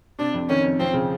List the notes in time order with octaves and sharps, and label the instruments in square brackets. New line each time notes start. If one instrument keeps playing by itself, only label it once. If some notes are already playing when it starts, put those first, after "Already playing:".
[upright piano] C3 [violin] D4
[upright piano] F2
[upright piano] D#3 [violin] C#4
[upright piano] F2
[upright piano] F3 [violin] C4
[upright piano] C#3